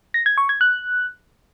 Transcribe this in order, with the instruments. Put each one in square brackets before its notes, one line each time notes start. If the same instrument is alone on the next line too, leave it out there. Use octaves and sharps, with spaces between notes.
[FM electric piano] A#6
G#6
C#6
G#6
F#6